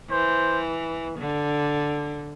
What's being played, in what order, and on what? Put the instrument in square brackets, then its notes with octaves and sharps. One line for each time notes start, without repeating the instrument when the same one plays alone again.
[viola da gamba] E3 [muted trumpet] C5
[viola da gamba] D3